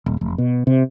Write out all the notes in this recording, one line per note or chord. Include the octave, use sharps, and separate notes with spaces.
D#1
F1
B2
C3